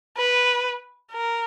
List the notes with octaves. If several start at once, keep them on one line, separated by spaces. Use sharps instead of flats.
B4
A#4